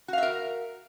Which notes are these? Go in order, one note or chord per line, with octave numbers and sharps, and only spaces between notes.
F#4 A#4 E5 F5